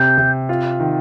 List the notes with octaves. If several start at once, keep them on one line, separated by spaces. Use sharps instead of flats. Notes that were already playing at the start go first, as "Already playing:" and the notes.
Already playing: C3 G6
C3
F4
D#3